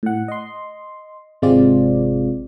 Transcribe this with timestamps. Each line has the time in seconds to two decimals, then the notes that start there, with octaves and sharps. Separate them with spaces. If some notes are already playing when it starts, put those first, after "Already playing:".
0.03 A2 F#5
0.28 D#5 C6
1.42 G#1 C3 G#3 C4 F4 D5